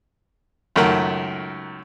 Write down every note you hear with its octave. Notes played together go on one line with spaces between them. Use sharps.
C#2 F#2 D#3 A3 A#4 F#5